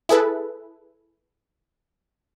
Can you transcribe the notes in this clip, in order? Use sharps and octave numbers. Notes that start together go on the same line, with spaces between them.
E4 G#4 A4 B4